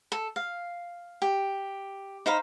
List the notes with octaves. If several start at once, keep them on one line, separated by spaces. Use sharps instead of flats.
A4
F5
G4
D#4 C5 F5 B5